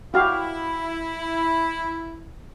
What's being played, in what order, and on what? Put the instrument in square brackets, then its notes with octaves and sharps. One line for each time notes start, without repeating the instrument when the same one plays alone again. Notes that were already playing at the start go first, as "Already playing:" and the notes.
[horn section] E4 [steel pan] F#4 G4 F5